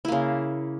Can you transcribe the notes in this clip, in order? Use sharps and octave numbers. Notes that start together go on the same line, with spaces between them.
C#3 A#3 E4